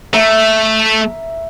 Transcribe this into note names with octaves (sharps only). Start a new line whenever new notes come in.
A3 E5 A#5